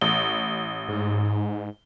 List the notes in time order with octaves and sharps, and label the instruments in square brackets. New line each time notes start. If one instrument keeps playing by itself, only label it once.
[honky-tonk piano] A1 [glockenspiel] G7
[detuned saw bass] G#2